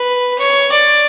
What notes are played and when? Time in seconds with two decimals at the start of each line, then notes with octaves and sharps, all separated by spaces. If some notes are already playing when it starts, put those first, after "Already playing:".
Already playing: B4
0.38 C#5
0.72 D5